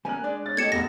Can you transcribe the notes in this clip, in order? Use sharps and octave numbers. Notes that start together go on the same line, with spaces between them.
G3 A#3 C#4 G#5 F#6
G#3 D4 D5
C#5 A6
A3 G4 D#5 G#6 C#7 E7
E1 E2 A2 A#6